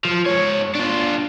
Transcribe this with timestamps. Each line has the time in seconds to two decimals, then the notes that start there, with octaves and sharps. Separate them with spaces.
0.05 F3
0.26 G#2 C#5
0.75 D4 F4